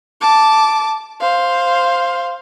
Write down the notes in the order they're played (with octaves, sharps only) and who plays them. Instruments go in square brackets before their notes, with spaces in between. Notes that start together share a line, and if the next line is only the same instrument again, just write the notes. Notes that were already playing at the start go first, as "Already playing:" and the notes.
[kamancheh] A5 D6
C5 F5